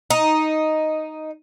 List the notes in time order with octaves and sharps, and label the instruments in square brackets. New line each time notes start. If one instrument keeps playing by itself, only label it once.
[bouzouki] D#4